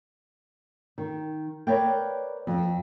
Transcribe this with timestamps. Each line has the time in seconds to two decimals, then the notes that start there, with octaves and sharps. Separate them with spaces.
0.98 D#3
1.67 A#4 B4 C#5 D5 F5 G5
2.47 F2